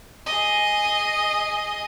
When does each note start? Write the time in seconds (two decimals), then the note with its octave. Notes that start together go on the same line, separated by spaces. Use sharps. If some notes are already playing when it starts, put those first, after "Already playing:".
0.26 G#4 D#5